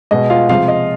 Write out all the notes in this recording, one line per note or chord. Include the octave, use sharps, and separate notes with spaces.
B2 G#3 D#5
F4 F5
C3 F3 G#3 F4 F5
D#5